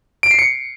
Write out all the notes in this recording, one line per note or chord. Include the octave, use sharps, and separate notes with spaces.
D7
C7
C#7